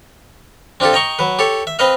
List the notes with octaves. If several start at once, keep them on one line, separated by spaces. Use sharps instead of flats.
C4 D4 F4 G4 A4
D#5 G5 A#5 C#6
F#3 B4
G4 A4 C#5
E5
C4 B4 C5 D#5 F5